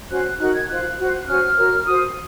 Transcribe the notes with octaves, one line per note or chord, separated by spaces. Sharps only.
C#4 F#4 C5 F#6
D#4 F#4 A#4 F#6
G#6
F4 C5 F#6
F#4 C5
C#4 F#4 C5 F6
F#4 A#4 C#5
F#4 C5 D#6